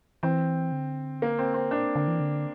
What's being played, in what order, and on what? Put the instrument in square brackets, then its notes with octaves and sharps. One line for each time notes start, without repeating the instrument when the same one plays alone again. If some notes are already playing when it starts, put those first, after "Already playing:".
[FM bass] E3 [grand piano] C4
[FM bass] D3
[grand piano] A#3
C4
C4
[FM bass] A#2 [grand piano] D4
[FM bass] D3
E3
D3